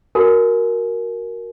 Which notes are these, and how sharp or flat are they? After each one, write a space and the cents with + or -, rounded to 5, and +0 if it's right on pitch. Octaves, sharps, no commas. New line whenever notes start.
F#4 +0 A#4 +0 G#5 +30